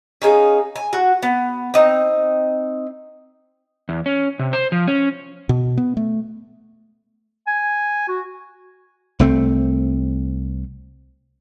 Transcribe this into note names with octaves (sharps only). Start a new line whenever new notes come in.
C#4 D#4 G#4 F5
G#5
F#4
B3
C4 D#4
E2
C#4
C3
C5
F3
C#4
B2
B3
A3
G#5
F#4
C2 A3 C4